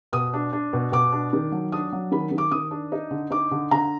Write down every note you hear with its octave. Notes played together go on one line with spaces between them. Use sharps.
B2 D#6
D4
D4
B2
B2 D6
D4
D#3
F#3
D4 D#6
F#3
D#3 B5
D#3
D6
D#3 D#6
D4
D#4
D3
D#4 D6
D3
D3 A#5